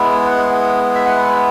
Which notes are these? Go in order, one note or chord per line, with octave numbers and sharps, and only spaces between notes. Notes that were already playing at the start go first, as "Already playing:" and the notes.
Already playing: G#3 B3 E4
F#5
E5
F#5